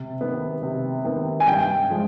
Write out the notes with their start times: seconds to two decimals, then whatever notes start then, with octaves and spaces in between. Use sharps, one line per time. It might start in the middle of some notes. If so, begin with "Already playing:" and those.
Already playing: C3
0.21 D#3 B3
0.62 C3
1.04 D#3 B3
1.40 G#5
1.47 G2 G5
1.90 F3 G#3